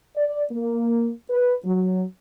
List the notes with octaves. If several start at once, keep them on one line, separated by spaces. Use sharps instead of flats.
D5
A#3
B4
F#3